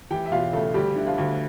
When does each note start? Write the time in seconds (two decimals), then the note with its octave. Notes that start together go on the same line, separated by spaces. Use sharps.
0.11 E3 G4 G5
0.26 E5
0.32 E1 F4 F5
0.53 C#3 A3 A4
0.74 D2 G3 G4
0.96 D3 E4
1.06 F3 F4
1.18 D2